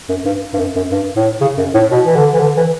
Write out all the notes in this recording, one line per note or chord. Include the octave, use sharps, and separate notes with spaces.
F#2
G2
G2
F#2
F#2
G2
A2
C#3
F#2
A2
B2
E3
D3
E3
D3
E3